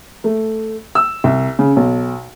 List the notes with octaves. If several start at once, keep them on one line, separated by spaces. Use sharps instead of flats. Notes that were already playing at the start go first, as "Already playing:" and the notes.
A3
E6
C2
C#3
B1